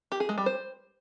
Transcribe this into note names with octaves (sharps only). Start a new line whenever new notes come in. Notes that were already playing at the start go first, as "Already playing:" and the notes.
G4
G#4
G#3
G3
C5